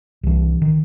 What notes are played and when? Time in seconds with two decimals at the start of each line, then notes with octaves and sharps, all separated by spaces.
0.23 C2 E3
0.62 D#3